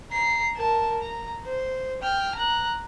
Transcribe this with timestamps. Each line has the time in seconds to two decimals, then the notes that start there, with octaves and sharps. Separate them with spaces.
0.12 A#5 C7
0.56 A#4 A5
1.02 A#5
1.43 C5
2.03 G5 F6
2.35 A#5 F#6